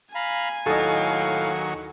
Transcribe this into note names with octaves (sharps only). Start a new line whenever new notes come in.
F5 G#5 A#5 B5
D#2 A2 F#3 A4 D#5 F5 C#6